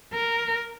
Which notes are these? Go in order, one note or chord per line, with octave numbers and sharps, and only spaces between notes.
A#4